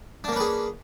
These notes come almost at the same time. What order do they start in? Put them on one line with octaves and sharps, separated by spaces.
D4 A#3 C#4 B4 G#4